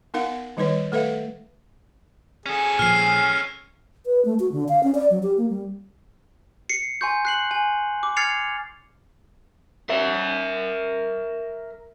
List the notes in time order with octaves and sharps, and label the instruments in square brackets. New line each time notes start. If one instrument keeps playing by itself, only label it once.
[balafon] B3 D#4 A#4 F5 F#5
D#3 G3 D#4 B4 C#5
A3 A4 B4 E5 F5
[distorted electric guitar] C#4 A4 [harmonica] G#4
[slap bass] A#2 F3 [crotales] F6 C7
[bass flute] B4
A3
F#4
D3
F5
C#4
D5
F#3
G4
A#3
G3
[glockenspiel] C7 C#7
G#5 C6 C#6 G6
F#6 C7 F#7
G#5
D6
F6 G#6 A6 C7 C#7 F7
[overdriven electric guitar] A#4 E5